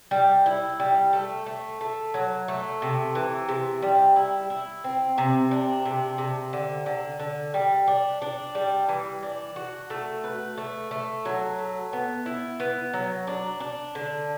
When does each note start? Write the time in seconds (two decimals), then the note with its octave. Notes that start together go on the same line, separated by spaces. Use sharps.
0.11 G3
0.46 E4
0.79 G3
1.13 A3
1.46 A3
1.81 A3
2.14 F#3
2.48 A3
2.82 C3
3.15 E3
3.49 C3
3.82 G3
4.16 E4
4.50 E4
4.84 C4
5.18 C3
5.51 D4
5.85 C3
6.18 C3
6.53 D3
6.86 D3
7.19 D3
7.54 G3
7.87 D4
8.22 D4
8.55 G3
8.89 E3
9.23 D4
9.56 F#4
9.90 A3
10.24 B4
10.58 A3
10.91 A3
11.25 F#3
11.59 A3
11.93 B3
12.26 E4
12.60 B3
12.93 F#3
13.27 D4
13.60 D4
13.95 D3